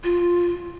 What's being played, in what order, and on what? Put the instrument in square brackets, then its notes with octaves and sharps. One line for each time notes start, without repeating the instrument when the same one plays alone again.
[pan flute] F4